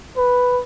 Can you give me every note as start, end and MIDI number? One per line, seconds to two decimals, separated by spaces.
0.17 0.62 71